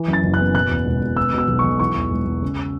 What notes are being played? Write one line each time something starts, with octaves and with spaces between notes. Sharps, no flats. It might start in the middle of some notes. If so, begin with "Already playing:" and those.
Already playing: E3
F#2
A6
F#1
F#6
B3
B2 F#6
E2
E1
E1
B3 E6
B2
E6
B1
C#6
B1
E3 C#6
E2
E1
E1
C#3